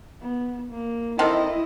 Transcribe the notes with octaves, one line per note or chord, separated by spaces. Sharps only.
B3
A#3
D#3 C4 E4 A4 D#5